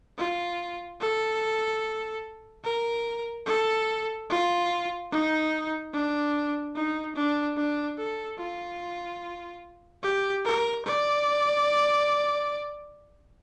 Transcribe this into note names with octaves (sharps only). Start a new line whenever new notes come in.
F4
A4
A#4
A4
F4
D#4
D4
D#4
D4
D4
A4
F4
G4
A#4
D5